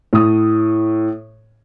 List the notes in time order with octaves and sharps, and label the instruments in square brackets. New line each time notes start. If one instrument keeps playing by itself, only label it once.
[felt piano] A2 D#6